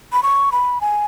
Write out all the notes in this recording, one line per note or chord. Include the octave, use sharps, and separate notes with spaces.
B5
C#6
B5
G#5